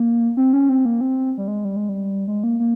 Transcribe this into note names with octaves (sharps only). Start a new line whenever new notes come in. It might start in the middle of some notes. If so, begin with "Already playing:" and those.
Already playing: A#3
C4
C#4
C4
A#3
C4
G3
G#3
G3
G#3
G3
G#3
A#3
A#3